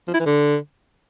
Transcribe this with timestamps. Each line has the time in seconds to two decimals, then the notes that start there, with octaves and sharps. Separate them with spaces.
0.08 F3
0.14 E4
0.20 E3
0.26 D3